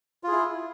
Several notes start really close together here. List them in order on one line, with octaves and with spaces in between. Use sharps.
F4 G#4 E4